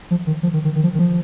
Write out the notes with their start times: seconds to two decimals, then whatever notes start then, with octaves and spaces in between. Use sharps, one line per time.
0.11 F3
0.27 D#3
0.43 F3
0.53 D#3
0.65 D#3
0.75 D#3
0.83 F3
0.94 D#3
0.99 F3